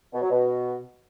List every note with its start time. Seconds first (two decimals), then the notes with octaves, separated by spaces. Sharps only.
0.13 B2
0.22 F#3
0.31 B2